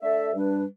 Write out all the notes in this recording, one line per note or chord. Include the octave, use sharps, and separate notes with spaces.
A3 D4 A4 E5
G2 G3 D4 B4